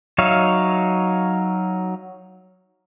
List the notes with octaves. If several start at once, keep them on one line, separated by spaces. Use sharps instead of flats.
F#3 D#4 C#5 E5 F5